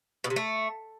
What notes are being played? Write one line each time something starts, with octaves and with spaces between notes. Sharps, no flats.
B2
C3
A3